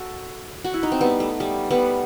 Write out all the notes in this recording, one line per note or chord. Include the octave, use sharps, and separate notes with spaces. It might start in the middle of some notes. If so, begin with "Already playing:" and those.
Already playing: F#4 A4
F#4
E4
D#4
C4
G3 B3
A3
G3
G3 B3